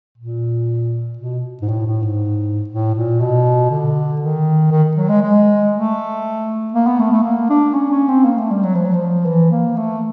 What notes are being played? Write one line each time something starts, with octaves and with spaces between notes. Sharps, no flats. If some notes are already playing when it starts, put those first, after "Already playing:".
A#2
B2
G#2
A2
A2
G#2
A2
A#2
B2
D3
D#3
D#3
F#3
G#3
G#3
A3
A#3
B3
A3
A3
A#3
D4
C#4
C#4
C4
A#3
A3
G3
F#3
F3
F#3
F3
E3
A#3
A3